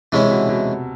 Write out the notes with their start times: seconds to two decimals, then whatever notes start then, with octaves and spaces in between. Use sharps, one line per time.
0.12 C3 E3 G#3 C#4 E4
0.23 C3
0.31 B2
0.49 B2